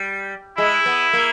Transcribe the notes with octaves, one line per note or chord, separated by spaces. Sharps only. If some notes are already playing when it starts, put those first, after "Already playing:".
Already playing: G3
G#3 E4
B3
A#3